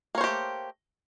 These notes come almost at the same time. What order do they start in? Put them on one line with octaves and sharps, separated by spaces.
A#3 C#5 C5 G4 A3